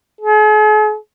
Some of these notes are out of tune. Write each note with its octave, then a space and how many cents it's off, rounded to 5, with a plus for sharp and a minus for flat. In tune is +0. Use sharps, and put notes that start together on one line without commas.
G#4 +45